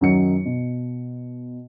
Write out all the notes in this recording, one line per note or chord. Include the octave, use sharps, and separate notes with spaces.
F#2 D#3 F#3 D#4 C#7
B2